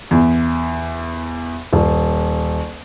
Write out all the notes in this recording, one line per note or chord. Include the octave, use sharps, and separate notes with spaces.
E2
D#1